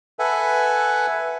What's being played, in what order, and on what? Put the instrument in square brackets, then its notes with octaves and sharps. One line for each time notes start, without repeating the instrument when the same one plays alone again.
[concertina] A4 B4 E5 F#5 G#5